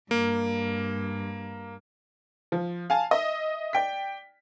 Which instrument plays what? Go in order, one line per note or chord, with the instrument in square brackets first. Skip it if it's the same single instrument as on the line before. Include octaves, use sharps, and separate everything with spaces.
[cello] G2 [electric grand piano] A#3
[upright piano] F3
F5 G#5 A5
D#5 E5
D5 G5 B6